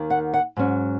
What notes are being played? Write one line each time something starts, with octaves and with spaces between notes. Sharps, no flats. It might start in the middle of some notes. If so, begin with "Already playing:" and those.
Already playing: D#2 D#3 A#3
F#5
F#5
G#2 F#3 C#4